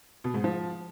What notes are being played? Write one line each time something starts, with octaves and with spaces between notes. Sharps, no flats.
B2
G#2
F3